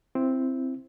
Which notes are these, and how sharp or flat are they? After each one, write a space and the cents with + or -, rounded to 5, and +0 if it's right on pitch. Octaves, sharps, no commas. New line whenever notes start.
C4 +0 E4 +20